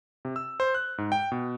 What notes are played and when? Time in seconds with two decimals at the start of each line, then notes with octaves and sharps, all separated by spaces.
0.25 C3
0.36 E6
0.60 C5
0.74 F#6
0.98 G#2
1.12 G5
1.32 B2